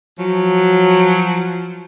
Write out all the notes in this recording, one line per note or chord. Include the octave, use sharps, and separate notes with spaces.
F3 F#3